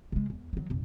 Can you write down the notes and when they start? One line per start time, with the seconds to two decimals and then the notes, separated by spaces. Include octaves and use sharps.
0.12 C#3 G#3
0.30 E2
0.53 D#3 F#3
0.70 F1 B1